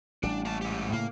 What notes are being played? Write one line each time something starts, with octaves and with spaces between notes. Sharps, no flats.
A1 G3 D4
A#3 A5
G#2 G4
A2 C#3 A#3